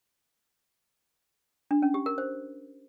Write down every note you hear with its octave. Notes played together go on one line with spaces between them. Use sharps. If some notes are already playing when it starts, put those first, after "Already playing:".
D4
C#4
G4
A#4
C5